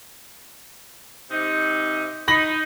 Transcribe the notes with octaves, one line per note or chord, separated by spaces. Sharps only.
C3 D#4
D#4 B5 A#6 F#7